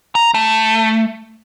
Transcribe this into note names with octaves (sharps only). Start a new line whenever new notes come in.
A#5
A3